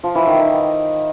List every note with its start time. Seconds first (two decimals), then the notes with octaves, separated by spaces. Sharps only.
0.03 F3
0.15 E3
0.27 D#3
0.38 D#4